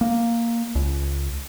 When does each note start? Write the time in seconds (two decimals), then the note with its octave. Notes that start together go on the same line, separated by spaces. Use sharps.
0.01 A#3
0.75 C#2